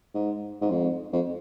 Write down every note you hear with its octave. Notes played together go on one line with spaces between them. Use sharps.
G#2
G#2
F2
F2